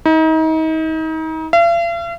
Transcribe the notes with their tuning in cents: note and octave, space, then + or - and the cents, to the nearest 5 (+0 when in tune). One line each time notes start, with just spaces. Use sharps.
D#4 +35
F5 -45